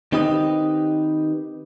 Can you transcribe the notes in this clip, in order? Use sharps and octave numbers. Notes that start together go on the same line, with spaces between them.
D#3 C4 D#4 G4 B4 D#5